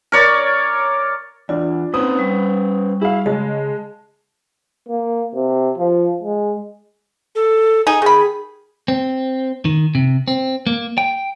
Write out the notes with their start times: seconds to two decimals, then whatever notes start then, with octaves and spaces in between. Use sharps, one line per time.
0.12 A#4 C#5 D5
1.49 E2 D4 F4
1.94 A#3 C4 C#4 D#4 B4 C5 D#6
2.19 G3 C#6
3.01 E4 G#4 F5
3.26 C#3 G#3 A5
4.89 A#3
5.35 C3
5.78 F3
6.23 G#3
7.35 A4
7.87 D#4 G#4
8.02 D#3 G#4 B5
8.88 C4
9.65 D#3
9.95 C3
10.28 C4
10.67 A#3
10.98 G5